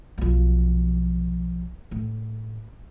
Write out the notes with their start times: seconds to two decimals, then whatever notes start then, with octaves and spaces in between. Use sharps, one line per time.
0.18 B1 F3
1.91 A2